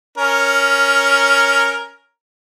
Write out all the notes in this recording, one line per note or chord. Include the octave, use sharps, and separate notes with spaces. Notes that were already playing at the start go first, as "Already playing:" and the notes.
C#4 A#4